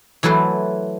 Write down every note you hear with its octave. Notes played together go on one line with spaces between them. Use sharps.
E3 F#3 A3 B4 C5